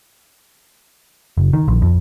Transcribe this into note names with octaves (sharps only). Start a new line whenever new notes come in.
F#1
D#3
A#1
F2